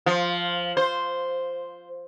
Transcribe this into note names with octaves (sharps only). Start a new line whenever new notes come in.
F3
C5